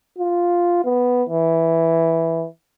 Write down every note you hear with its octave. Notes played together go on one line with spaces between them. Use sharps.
F4
B3
E3